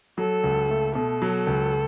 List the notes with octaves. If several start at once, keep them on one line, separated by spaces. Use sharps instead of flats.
F#3 A4
C#2
A3
B2 A4
F#3
C#2